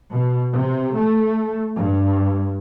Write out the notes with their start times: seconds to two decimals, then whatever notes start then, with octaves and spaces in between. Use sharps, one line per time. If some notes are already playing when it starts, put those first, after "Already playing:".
0.12 B2
0.52 C3
0.97 A3
1.77 G2